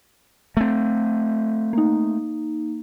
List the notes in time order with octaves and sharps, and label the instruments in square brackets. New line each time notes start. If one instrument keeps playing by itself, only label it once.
[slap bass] A3 C4
[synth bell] A#3 D#4